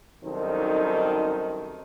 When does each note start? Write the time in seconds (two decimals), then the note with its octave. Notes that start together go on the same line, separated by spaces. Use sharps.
0.25 C2 F#2 D#3 D#4 A4 C5